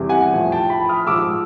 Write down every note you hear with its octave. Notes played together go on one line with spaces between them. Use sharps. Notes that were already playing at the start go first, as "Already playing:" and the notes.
Already playing: E2 C3 E3 G3
F#5 G#5
A2 F3
G5 A5
A5 B5
D#6 F6
G#2 F3 D6 E6